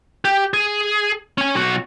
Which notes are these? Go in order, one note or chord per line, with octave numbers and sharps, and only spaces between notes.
G4
G#4
C#4 G#5
B1 F#4